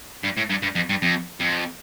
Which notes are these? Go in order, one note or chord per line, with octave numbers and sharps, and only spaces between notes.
G2
A2
G2
G2
F2
G2
F2
F2